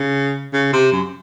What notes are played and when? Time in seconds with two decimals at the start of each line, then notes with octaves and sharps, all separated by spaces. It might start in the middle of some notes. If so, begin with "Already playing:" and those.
Already playing: C#3
0.53 C#3
0.73 C3
0.93 F#2